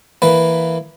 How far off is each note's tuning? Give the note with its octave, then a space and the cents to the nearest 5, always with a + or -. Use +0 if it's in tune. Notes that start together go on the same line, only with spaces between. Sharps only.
E3 +0 A#3 +0 B4 +0